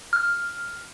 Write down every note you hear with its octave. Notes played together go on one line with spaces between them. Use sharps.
F6